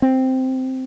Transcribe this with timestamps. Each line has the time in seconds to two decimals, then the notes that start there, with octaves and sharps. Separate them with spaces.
0.02 C4